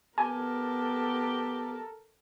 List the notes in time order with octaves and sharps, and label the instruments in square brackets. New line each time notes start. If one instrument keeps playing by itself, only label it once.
[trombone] B3 [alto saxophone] G4 [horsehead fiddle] A4 A#4 [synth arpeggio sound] G#5